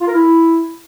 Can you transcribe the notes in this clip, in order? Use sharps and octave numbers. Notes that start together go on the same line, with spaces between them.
F4
A#4
E4